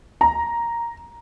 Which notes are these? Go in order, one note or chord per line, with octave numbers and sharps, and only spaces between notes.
A#5